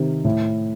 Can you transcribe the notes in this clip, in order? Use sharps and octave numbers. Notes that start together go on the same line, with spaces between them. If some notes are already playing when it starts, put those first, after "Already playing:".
Already playing: C3 D#3
A2